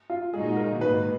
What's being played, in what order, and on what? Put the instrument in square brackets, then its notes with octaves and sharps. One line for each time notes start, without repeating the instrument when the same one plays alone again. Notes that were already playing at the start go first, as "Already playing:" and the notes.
[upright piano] F4
[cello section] A#2 G#3 D#4 F#4 [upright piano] G#4
[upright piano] A#4
[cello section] G#2 D#3 A#3 [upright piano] B4